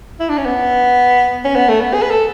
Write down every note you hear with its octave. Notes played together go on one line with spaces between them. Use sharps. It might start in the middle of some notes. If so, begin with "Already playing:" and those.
E4
D4
C#4
B3
C#4
B3
A3
B3
G#4
B4
A4